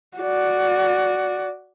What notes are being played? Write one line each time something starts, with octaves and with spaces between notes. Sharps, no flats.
F#4 D5